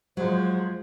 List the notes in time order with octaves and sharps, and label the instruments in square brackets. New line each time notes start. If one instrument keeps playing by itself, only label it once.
[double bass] F3 G#3 [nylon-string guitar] F#3 [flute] C5